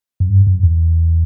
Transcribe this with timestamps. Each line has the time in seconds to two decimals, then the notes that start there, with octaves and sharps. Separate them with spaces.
0.20 F#2
0.29 G2
0.47 F#2
0.63 E2